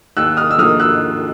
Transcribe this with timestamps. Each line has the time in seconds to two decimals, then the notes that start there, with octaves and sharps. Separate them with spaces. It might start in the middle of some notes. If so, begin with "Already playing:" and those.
0.17 D#2 E6 F#6
0.37 D#6 F6
0.51 E6
0.58 D3 F3 A#3 D#6 F6
0.80 E6 F#6